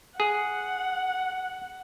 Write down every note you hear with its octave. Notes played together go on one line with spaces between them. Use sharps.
G#4 F#5